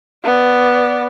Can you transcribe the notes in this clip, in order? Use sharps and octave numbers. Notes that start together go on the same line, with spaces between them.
B3 D5